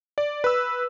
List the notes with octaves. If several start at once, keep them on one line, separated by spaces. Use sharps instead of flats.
D5
B4 E6